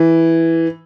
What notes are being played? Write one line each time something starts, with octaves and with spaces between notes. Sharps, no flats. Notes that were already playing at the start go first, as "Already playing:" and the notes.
Already playing: E3